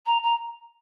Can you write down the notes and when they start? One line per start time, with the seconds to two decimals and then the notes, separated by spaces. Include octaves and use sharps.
0.06 A#5
0.23 A#5